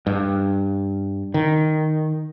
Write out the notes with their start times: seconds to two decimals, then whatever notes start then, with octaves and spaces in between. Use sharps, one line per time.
0.07 G2
1.34 D#3